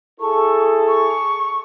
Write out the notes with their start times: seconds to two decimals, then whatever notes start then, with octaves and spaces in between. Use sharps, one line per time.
0.20 E4 G#4 A4 C#6
0.88 C#6